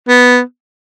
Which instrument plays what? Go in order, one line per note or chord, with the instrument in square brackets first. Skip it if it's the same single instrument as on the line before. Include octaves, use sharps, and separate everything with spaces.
[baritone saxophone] B3